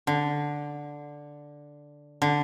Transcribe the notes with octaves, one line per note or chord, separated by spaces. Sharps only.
D3
D3